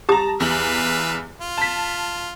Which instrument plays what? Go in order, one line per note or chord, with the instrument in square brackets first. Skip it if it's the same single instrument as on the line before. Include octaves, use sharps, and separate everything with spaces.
[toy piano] G4 D#6 [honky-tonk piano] A5 A#5
[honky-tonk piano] E2 F#7 [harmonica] B4 E5 F5
[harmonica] F4
[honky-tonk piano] A5 B6